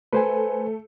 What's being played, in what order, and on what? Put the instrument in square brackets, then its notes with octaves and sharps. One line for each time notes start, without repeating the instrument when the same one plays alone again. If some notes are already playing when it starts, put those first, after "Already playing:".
[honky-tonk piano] A3 [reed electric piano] B4 C5 G#5